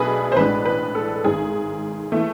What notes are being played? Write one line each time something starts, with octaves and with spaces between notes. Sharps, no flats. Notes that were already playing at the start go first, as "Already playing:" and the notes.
Already playing: B1 B2 A3 D4 G#4 B4
C5
A1 A2 G#3 D4 B4
B4
A4
G#1 G#2 G#3 G#4
E3 A3